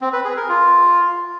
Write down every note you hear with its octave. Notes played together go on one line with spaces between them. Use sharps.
C4
B4
G#4
A#4
F4